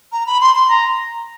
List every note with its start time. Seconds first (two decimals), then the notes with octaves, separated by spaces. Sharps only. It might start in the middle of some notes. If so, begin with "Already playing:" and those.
0.12 A#5
0.26 B5
0.41 C6
0.55 C6
0.69 A#5